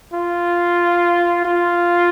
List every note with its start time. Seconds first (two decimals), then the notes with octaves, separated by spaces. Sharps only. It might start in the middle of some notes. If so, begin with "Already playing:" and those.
0.14 F4
1.45 F4